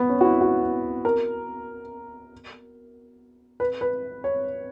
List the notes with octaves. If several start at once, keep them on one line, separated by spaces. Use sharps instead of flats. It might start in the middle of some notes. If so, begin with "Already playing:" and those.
Already playing: B3
C#4
F#4
E4
F#4
A#4
B4
B4
C#5